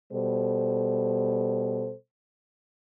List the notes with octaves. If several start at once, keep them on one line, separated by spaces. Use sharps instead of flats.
B2 G3 A4 C5